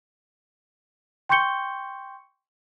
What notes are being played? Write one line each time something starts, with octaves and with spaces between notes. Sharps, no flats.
G5 C6 C#6 G6 C#7 G7